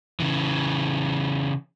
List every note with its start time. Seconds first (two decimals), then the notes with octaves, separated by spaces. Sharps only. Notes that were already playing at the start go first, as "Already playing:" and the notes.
0.20 C#3 E3